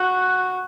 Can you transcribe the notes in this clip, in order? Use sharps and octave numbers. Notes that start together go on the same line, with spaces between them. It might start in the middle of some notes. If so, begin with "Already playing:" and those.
Already playing: F#4 F#6